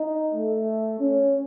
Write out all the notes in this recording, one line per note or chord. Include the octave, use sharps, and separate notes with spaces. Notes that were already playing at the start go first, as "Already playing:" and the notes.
Already playing: D#4
A3
C#4